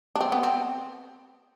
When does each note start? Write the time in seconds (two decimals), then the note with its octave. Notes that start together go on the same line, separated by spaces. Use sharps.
0.15 D4
0.21 C4
0.32 B3
0.43 C4